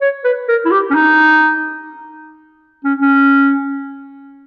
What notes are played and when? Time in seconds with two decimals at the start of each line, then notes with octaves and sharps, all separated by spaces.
0.01 C#5
0.24 B4
0.49 A#4
0.65 E4
0.71 G4
0.90 C#4
0.95 D#4
2.84 C#4
3.01 C#4